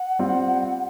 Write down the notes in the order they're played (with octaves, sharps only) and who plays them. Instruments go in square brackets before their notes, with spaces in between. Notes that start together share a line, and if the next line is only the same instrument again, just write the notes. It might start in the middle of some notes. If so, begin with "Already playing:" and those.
Already playing: [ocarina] F#5
[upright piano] G3 C4 F4